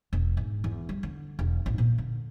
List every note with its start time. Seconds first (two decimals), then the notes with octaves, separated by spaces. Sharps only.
0.13 E1
0.37 G#2
0.64 E2
0.89 G3
1.03 D3
1.39 E1
1.66 A1
1.78 A#2
1.98 D3